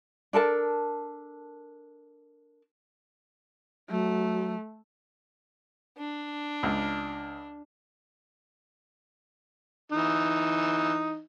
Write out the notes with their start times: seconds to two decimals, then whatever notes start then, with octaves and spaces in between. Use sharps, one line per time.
0.33 D4 A4 A#4 A5
3.90 F#3 A3
5.98 D4
6.63 C#2
9.92 E3 D#4